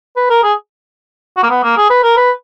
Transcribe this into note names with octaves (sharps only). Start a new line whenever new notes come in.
B4
A#4
G#4
F#4
A#3
B3
A#3
G#4
B4
A#4
B4